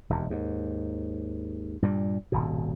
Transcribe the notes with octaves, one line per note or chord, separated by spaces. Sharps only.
E1 D#2
D#2 G#2
G2 A#2 G3
D#1 G#1 B2